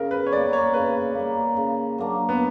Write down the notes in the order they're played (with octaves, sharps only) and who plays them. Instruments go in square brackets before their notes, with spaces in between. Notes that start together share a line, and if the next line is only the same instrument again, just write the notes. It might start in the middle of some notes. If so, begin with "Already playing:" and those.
Already playing: [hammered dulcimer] C#3 [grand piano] A#4
[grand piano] B4
C#5
[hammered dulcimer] G3 A#3 [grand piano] D5
[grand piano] C#5
[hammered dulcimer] C#3 [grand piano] B4
[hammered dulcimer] G3 A#3
C#3
F#3 A#3 D4
[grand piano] B3